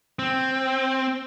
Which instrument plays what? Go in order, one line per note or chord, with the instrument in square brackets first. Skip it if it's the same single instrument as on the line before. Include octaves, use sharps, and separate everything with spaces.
[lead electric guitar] C4